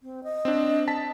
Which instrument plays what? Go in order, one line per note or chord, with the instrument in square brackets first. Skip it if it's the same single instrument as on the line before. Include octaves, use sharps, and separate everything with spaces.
[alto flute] C4
D#5
[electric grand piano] C4 D4
A5 B6